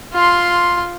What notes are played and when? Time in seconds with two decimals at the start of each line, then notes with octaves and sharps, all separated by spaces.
0.13 F4 C6